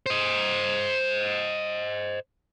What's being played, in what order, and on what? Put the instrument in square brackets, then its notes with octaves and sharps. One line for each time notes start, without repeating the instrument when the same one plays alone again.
[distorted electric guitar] C5 D#5